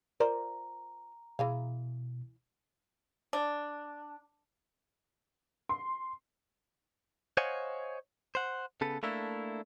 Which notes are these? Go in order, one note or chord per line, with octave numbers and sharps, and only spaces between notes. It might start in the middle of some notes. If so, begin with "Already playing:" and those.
F4 A#4 C5 D5 A#5
B2 E3 G#4 F5
D4
C6
C5 C#5 D#5 F5 F#5 G#5
C5 F#5
C#3 B3 A4 B4
A3 A#3 D4 E4 A4